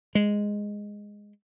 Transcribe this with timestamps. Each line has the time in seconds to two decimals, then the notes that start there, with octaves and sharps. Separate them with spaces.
0.15 G#3